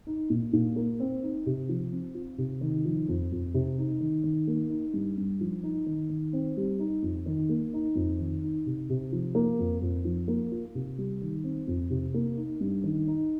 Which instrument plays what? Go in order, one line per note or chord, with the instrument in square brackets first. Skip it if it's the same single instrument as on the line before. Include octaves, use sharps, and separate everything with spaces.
[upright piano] D#4
A#2
A#2
A#3
C4
D#4
C3
F3
C4
F4
C3
D#3
F3
F2
F2
C3
D#4
D#3
D#3
A#3
D#4
G2
G2
F3
D#4
D#3
D#3
C4
G3
D#4
F2
D#3
A#3
D#4
F2
D#3
D#4
C3
C3
F3
A#3
F2
F2
F3
A#3
F4
C3
G3
D#3
C4
F2
C3
A#3
D#4
G2
D#3
D#4